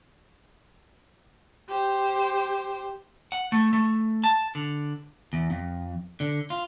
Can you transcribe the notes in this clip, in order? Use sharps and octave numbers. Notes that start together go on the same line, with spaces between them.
G4 C5
F#5
A3
A3
A5
D3
E2
F2
D3
F4